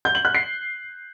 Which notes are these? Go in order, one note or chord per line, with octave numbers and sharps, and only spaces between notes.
G6
F#7
F#6
C7